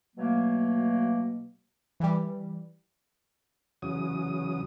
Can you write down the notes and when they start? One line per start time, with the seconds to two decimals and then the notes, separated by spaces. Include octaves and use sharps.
0.16 B2 F#3 A3 A#3
2.00 E3 G3
3.82 E2 C#3 F#3 D#6